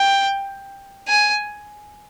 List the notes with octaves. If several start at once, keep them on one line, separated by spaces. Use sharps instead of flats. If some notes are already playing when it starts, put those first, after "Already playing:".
Already playing: G5
G#5